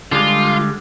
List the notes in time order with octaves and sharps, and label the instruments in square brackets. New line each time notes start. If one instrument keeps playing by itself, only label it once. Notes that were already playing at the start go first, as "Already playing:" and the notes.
[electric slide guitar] D3 G3 G#3 [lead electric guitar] F4